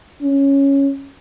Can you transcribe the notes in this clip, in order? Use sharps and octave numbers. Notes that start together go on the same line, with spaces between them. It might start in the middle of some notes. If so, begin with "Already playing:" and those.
C#4